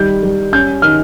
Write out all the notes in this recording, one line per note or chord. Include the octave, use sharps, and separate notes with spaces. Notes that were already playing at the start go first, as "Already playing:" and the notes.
Already playing: D#3 G3 G6
G3
C#4 G6
D#3 F6